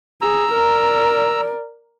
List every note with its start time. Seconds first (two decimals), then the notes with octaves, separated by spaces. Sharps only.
0.22 G#4 A#5 E6
0.53 A#4 D5